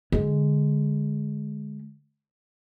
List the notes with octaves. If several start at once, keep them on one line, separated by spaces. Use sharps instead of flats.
D3 G#3